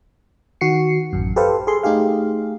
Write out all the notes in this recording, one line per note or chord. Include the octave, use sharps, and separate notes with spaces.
D#3 F#4 C7 C#7
A1 F#2
G4 A4 B4 C5 F5
G#4 A4 C6
A3 D#4 G4 G#4 F5